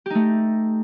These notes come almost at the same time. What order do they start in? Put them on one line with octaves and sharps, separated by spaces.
G4 D#4 A3